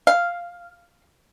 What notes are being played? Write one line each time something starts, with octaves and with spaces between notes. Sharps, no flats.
F5